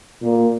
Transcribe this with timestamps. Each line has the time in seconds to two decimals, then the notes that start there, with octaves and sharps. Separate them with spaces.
0.23 A#2